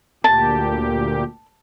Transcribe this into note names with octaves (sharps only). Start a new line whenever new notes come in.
D2 A#2 G4 A5